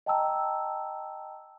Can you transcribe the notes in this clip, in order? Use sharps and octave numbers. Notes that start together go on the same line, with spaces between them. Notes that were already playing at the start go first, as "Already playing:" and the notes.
D#5 G5 A5 A#5 E6